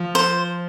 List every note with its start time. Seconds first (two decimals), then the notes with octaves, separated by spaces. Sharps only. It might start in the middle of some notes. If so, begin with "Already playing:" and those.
Already playing: F3
0.15 C5